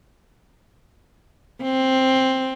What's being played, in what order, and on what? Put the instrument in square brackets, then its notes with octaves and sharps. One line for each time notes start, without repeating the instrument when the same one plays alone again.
[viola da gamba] C4